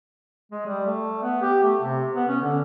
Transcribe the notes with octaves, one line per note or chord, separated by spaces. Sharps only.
G#3
G3
A3
B3
G4
A3
C3
B3
C#4
D3